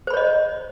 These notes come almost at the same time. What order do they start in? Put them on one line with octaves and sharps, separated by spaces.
C5 B5 C#5 D#5